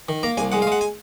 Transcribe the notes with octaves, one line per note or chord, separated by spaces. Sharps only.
D#3
A#3 A#5
C2 G#5
G#3 F#5
F5
G#3 F#5
G#5